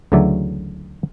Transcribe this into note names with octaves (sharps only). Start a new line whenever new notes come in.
D2 C#3 E3 F#3 D5 E5